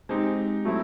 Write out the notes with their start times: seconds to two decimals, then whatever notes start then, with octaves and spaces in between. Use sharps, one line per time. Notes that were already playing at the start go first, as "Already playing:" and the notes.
0.09 G#3 C4 D#4 G4
0.65 F#3 A3 C4 E4